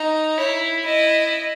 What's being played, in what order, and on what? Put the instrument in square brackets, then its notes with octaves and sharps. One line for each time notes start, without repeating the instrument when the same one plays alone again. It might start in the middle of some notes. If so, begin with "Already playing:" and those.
Already playing: [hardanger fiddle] D#4
[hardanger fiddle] E4 [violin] C#5
[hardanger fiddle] E4 [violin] D#5